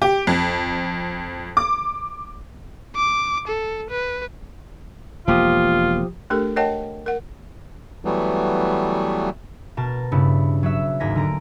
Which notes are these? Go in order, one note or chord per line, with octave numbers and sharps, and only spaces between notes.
G4
F2
D6
D6
A4
B4
E1 F3 A#3 F4 G4 D#6
A3 D4 G4 A4 A#4
A#4 C#5 D#5 F#5 G5 A5
A#4 F#5
E3 F#3 G3 A3 B3
B2 A#4 A5
G2 C#3 B3 E4
F#3 F#4 E5 E6
D#2 G#2 A#4 G#5 A#6 B6
D3 A#5 D7